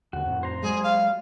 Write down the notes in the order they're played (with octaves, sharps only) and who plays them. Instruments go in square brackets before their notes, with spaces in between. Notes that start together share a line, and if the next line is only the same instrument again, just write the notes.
[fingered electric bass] D#2 D3 [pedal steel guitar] F#4
[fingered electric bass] F2 A2
[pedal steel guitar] C5 A#5
[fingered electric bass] F#3 G#3 [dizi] G#4
[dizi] F5